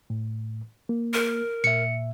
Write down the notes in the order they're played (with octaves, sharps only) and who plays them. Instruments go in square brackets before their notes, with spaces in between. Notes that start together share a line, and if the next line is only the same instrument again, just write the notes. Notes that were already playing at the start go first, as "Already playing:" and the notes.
[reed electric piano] A2
A#3
[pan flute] A#4
[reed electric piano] A#2 E5 [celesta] C#7